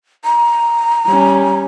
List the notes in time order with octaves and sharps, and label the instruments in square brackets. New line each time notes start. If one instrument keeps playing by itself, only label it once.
[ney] A#5
[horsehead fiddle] G3 C#4